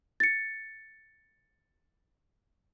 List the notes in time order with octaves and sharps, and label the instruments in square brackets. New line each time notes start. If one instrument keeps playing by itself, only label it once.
[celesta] A6 C#7